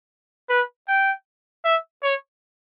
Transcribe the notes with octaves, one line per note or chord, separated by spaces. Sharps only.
B4
G5
E5
C#5